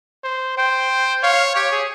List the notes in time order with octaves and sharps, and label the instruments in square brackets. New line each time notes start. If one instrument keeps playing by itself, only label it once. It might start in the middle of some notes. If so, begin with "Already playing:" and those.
[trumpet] C5
[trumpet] C5 [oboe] G5
[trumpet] C#5 [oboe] F5
[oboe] F5
[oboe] G4 [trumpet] C#5
[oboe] G#4